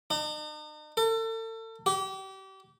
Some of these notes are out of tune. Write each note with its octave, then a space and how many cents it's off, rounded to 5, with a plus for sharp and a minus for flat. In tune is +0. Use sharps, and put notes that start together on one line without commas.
D#4 -45
A4 +40
G4 -35